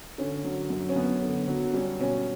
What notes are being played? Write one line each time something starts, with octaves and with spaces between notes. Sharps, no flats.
D3 C#4
F#3
F#2
C#4
F#2 B3
D3
F#3
G3 C#4
B2 C#4